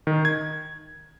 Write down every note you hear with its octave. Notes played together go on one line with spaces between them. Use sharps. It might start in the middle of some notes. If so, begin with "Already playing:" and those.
D#3
G#6